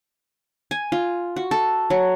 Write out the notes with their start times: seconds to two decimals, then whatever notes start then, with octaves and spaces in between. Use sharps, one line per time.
0.71 G#5
0.92 F4
1.36 F#4
1.51 A4
1.90 F#3